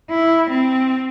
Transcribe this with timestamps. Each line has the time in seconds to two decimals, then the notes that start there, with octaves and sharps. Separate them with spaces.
0.11 E4
0.50 C4